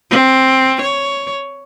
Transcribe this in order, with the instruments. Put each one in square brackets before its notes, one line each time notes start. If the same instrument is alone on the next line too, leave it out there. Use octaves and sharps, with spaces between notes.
[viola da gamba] C4
C#5